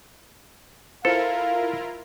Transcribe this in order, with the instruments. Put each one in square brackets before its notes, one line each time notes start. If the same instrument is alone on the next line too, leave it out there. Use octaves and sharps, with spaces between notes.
[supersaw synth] E4 F4 A#4 [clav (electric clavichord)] A4 [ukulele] C5 [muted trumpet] F5